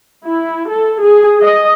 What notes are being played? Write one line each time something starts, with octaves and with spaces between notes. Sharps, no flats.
E4
A4
G#4
D#5